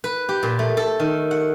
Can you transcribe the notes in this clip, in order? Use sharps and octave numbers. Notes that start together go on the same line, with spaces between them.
B4
G4
A#2
A3
A4
D#3
F#5